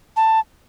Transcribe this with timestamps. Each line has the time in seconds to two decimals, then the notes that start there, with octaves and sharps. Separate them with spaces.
0.17 A5